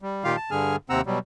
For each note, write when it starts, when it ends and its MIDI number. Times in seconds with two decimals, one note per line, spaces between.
0.02 0.24 55
0.24 0.36 46
0.24 0.36 51
0.24 0.36 65
0.24 0.36 67
0.24 0.36 77
0.36 0.51 81
0.51 0.76 43
0.51 0.76 50
0.51 0.76 68
0.51 0.76 80
0.51 0.76 89
0.90 1.01 39
0.90 1.01 48
0.90 1.01 60
0.90 1.01 78
0.90 1.01 82
0.90 1.01 88
1.06 1.19 47
1.06 1.19 54
1.06 1.19 55